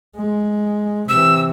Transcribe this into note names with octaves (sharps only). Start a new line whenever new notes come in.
G#3
C3 E3 E6